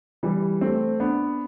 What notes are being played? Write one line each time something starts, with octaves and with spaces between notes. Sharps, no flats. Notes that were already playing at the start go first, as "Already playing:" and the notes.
E3 G3
A3 C4
B3 D4